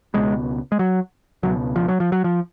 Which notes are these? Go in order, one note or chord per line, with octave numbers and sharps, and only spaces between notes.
C#2 B2 G#3
G#3
F#3
C#2 B2 F#3
F3
F#3
F3
F#3
F3